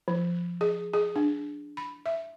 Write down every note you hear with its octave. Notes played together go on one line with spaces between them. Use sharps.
F3
G#4
G#4
D4
B5
E5